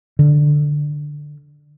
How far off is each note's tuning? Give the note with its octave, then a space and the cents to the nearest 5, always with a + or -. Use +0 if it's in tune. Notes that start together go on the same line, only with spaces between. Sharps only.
D3 +10